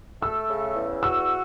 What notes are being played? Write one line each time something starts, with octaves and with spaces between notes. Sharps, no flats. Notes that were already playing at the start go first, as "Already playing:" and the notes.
A3 E6
C#3
E2
F#4 E6